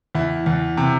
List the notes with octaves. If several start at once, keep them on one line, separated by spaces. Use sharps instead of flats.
E2 E4
E2
C3